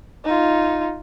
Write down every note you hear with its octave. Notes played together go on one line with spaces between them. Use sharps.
D#4 F4